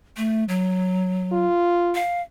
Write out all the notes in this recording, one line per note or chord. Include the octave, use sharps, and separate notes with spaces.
A3
F#3
F4
F5